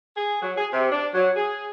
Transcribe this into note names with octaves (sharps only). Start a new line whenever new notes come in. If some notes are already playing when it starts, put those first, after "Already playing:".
G#4
F#3
G#4
C3
D4
F#3
G#4